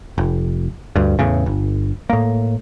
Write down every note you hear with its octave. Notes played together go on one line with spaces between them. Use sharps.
F1
D2 G2
E2 A2 C#3
G1
A2 A#3